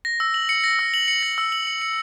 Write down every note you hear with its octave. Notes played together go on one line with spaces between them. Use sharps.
A#6
E6
F#7
C#7
A#6
E6
F#7
C#7
A#6
E6
F#7
C#7
C#7